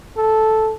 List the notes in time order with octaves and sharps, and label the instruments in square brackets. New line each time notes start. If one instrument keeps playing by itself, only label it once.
[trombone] A4